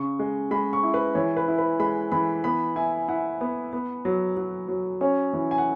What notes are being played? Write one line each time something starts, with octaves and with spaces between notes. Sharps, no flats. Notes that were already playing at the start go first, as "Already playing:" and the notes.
Already playing: C#3 C#6
G#3
G#3 B5
C#6
E4
B4
E3 C#5
B4
E4
B4
G#3 B5
E3 B5
B3 B5
E4 G#5
E4 F#5
B3
B3
F#3
F#3
F#3
C#4 C#5
E3
G#5
F#5